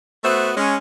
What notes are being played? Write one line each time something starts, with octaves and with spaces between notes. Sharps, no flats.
A3 B3 F#4 C5 E5
G#3 C#4